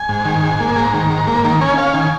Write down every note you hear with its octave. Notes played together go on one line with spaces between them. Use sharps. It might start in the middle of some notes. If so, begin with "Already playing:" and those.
Already playing: G#5
G#2
D#3
G#2
A#3
G#2 A#5
D#3
G#2
A#3
D#3 A#5
C#4 G#5
C#4 F5
D#3 G#5